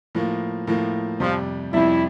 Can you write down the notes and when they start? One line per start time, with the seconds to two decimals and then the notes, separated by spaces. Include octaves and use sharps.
0.15 A2 F3 A#3
0.67 A2 F3 A#3
1.20 F2 C3 F3 G3
1.73 F2 C3 G3 E4